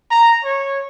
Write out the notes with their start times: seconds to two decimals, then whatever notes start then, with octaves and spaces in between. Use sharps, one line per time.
0.11 A#5
0.44 C#5